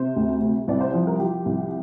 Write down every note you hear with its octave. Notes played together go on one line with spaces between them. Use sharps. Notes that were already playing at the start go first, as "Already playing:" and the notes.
Already playing: C3 C5
D2
C3
C2 D5
C5
F3
A#4
F3 G4
C2